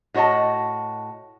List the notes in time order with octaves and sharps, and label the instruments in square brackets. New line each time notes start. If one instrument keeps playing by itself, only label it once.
[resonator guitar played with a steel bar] A2 F#4 C#5 D#5 A5